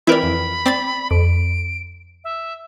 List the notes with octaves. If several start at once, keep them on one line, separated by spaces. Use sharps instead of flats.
E3 C4 E4 A#4 B4 D5 B5
F2
C4 D5 C6 A6
F2 D7
E5